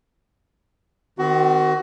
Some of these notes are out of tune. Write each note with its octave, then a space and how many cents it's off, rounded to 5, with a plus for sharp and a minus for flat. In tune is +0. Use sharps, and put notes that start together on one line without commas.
D#3 -15 C4 -35 F#4 +25